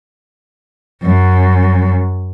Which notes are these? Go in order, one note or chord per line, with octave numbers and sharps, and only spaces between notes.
F#2